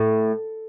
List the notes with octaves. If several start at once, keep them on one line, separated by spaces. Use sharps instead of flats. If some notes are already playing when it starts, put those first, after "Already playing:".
Already playing: A2